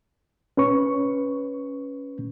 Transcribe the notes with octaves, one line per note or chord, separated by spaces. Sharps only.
C#4 B4 C#6